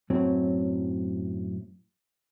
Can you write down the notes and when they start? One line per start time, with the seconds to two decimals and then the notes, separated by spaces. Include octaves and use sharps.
0.10 F#2 A2 F#3 C4